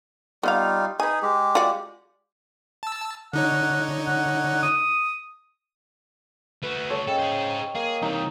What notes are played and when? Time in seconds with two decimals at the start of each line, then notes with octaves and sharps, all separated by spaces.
0.43 G3 B3 D#4 F4 B4 F5
1.00 D#4 G#4 B4 G#5
1.22 G#3 G4
1.55 F4 F#4 D5
2.83 A5 E6
3.33 D3 D#4 C#5 F#5
4.07 F#5
4.63 D#6
6.63 A3 F#4 B4
6.90 A4 C#5
7.07 C#3 A4 D#5 G5
7.19 G#4 C5
7.75 A#3 G#4
8.02 C3 E3 D#4